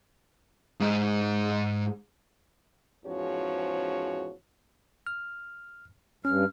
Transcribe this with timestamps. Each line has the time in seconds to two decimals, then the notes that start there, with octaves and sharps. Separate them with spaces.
0.80 G#2 D#4
3.05 E2 G#2 F3 C#4 F#4 C#5
5.07 F6
6.25 G2 C#4 F6